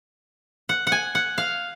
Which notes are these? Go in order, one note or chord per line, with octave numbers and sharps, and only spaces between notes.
F#5
F#5
G#5
F#5
F5